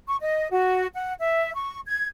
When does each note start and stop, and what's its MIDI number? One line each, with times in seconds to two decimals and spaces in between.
0.08 0.17 85
0.21 0.48 75
0.50 0.87 66
0.94 1.14 78
1.19 1.52 76
1.55 1.78 85
1.87 2.07 92